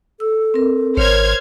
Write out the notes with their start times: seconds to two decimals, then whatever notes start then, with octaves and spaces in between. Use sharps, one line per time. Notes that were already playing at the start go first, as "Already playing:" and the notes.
0.20 A4 E6
0.54 C4 A#4
0.97 G#1 A#4 C5 C#5 F6 G#6